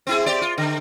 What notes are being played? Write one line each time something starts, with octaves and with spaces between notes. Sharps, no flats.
C4 E4 G#4
C4 G4 D5
F4
D3